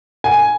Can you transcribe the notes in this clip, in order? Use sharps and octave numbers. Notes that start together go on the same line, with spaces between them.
G#5